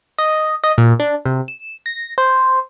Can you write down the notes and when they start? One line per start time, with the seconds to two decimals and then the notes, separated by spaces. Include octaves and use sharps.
0.18 D#5
0.64 D#5
0.78 A#2
0.99 D4
1.26 C3
1.48 E7
1.86 A#6
2.18 C5